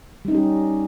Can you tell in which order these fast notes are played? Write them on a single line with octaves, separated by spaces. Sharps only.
G3 D#4 C#4 G4